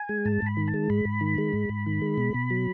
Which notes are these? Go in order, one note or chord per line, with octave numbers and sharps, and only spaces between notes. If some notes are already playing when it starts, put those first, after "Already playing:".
Already playing: G#5
G#3
G#2 A5
G#2 B5
D#3
A5
G#3
G#2 B5
G#2
D#3
G#3
G#2
G#2
D#3
G#3
B2
B2
F#3